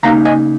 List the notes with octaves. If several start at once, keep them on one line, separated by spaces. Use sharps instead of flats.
C#3 A#3 D#4 F5 A#5
D#5 G#5